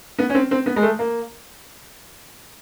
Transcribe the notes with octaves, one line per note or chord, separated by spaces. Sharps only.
B3
C#4
C4
C4
B3
G#3
A3
A#3